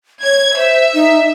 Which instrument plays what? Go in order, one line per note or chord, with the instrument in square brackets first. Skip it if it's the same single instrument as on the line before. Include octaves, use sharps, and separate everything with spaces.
[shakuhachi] C#5 [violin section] G#6
[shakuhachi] C5 [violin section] E5
[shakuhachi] D#4